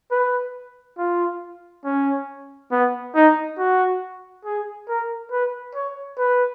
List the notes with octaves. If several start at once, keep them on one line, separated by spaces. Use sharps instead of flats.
B4
F4
C#4
B3
D#4
F#4
G#4
A#4
B4
C#5
B4